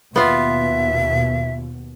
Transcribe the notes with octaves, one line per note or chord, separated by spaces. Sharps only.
D#2 B2 B3 F4 E5